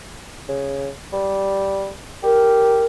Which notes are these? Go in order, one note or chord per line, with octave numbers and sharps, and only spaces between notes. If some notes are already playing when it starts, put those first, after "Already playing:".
C#3
G3
G4 A#4